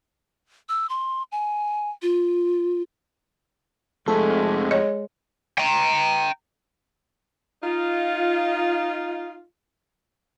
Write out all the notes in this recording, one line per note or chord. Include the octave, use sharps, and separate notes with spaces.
E6
C6
G#5
F4
F2 G#3 A3 A4
C#5 D#5
G5 A#5
D#4 F4